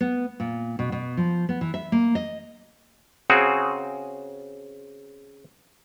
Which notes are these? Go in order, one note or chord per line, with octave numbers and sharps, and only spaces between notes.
B3
A#2
B2
B2
F3
B3
E3
E5
A#3
D#5
C#3 C4 F#4 G#4